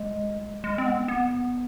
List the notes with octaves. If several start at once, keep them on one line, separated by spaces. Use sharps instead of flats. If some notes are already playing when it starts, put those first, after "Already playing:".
Already playing: G#3
G#3
C4
B3
B3